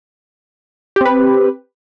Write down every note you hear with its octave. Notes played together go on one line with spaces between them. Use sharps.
C4 G4 B4